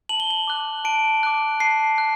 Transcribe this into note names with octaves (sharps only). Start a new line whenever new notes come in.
A5 F#7
G7
F#7
D6 F#6
A5 D7
D6 F#6
A5 C7
F#6